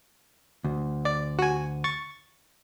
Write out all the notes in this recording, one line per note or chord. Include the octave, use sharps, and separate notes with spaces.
D2
D5
F#4 G#5
C#6 A6